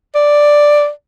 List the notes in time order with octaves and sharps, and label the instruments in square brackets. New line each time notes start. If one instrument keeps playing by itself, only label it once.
[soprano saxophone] D5